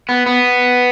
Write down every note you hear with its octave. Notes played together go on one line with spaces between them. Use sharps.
B3
B3